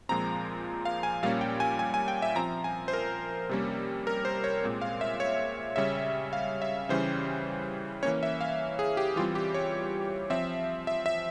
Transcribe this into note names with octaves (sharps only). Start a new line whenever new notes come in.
A#2 F3 G#3 C4 A#5
F5
G#5
A#2 G3 A#3 C#4 F5
G5
G#5
G#5
G#5
G5
E5
F3 C4 A#5
G#5
C5
A#4
C3 G3 A#3 C#4
A#4
C5
C#5
A#2 G#3 C4
F5
E5
C#5
C#3 G3 C#4 E5
F5
E5
C#3 E3 G3 C#4 C5
E3 A#3 C#4 C#5
E5
F5
G#4
G4
E3 G3 C4 F4
G4
C#5
F3 C4 E5
E5
E5